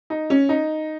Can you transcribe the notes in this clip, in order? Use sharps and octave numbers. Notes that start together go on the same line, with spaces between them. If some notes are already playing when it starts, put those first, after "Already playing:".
D#4
C#4
D#4